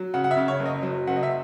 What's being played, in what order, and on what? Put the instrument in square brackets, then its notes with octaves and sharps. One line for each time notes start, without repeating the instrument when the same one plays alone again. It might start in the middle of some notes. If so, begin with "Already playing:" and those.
Already playing: [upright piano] F#3
C#3 F#5
F#5
E5
C#3
C#5
F#1
D#5
F#3
F#1 F#5
D#5
E5